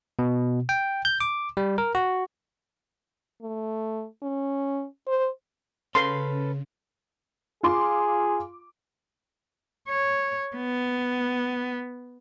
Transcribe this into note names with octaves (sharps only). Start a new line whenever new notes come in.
B2
G5
G6
D6
G3
A#4
F#4
A3
C#4
C5
C#3 C#4 A4 B4 C6
F4 G#4 C6 D6
C#5
B3